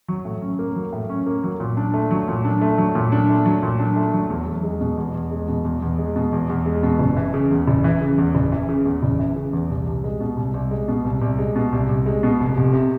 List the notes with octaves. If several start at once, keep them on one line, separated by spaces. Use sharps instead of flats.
F#3
A2
C#4
A#3
F#3
A2
C#4
A#3
F#3
A#2
D4
A3
F#3
A#2
D4
A3
F#3
A#2
D4
A3
F#3
A#2
D4
A3
F#3
E2
E2
G#3
B2
E2
E2
G#3
B2
E2
E2
G#3
B2
E2
E2
G#3
B2
F#1
E3
C#3
E2
F#1
E3
C#3
E2
F#1
E3
C#3
E2
F#1
E3
C#3
E2
C2
C2
G#3
B2
C2
C2
G#3
B2
C2
C2
G#3
B2
C2
C2
G#3
B2
F1
F1
C3